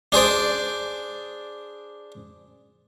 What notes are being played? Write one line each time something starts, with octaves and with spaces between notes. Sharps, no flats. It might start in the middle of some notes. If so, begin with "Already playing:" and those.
D4 G#4 C5 D5